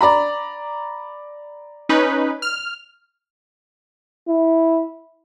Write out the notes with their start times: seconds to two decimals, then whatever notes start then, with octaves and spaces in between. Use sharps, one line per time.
0.01 D5 A#5 B5
1.89 C#4 D#4 B4
2.42 F6
4.29 E4